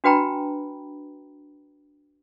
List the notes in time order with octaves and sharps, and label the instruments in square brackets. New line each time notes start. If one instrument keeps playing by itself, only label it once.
[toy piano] D4 F#4 B4 G5 A#5 B5